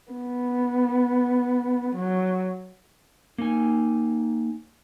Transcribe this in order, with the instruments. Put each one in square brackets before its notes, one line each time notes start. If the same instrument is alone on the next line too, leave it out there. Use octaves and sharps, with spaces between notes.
[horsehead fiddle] B3
F#3
[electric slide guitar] A#3 D#4 G#5